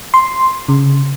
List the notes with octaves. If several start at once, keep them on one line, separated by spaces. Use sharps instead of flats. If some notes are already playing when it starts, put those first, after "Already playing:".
C6
C#3